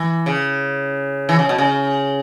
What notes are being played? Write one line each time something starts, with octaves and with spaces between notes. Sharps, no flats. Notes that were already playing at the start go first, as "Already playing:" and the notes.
Already playing: E3
C#3
E3
C#3
B2
C#3